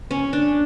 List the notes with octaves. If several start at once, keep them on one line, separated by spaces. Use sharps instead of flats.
C#4
D4